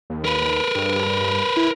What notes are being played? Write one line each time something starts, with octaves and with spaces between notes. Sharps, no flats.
D#2
A#4 B4
G2
E4